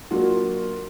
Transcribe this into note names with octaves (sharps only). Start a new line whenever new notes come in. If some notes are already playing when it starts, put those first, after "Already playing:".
F#3 A#3 D4 F4 F#4